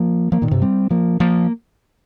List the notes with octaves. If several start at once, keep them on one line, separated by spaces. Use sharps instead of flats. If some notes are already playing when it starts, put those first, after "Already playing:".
Already playing: F3 A#3
F3 A#3
A#2 D#3
G2 C3
G3 C4
F3 A#3
F3 A#3